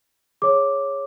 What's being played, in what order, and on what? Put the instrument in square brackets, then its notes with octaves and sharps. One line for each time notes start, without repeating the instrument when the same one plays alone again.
[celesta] G#4 C#5 D6